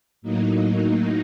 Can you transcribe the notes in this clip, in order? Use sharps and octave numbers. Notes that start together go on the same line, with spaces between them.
A2 F#3 A#3 D#4